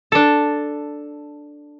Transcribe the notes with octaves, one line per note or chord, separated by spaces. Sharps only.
D4 A4